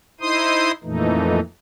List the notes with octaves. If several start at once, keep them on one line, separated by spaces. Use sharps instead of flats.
D#4 E4 C5 C6 D#6
F2 A#2 E3 A3 D#4